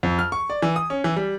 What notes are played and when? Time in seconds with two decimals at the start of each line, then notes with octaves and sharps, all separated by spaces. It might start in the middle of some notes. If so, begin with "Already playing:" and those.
0.03 F2
0.19 F6
0.32 C#6
0.50 D5
0.62 E3
0.76 D#6
0.90 C#4
1.04 E3
1.16 G3